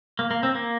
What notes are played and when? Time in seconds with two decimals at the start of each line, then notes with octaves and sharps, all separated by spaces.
0.19 A#3
0.31 A#3
0.43 C4
0.55 A#3